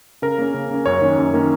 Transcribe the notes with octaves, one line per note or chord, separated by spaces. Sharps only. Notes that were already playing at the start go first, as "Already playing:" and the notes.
C#3 A#4
A#3 C#4
C#3
A#3 C#4
F#2 C#5
D#3 A#3 C#4
F#2
D#3 A#3 C#4